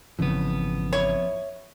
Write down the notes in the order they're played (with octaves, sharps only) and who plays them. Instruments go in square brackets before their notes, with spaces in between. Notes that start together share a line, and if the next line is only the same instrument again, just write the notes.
[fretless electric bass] G#1 C#3 E3 [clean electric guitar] F2 B3
[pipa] E4 C#5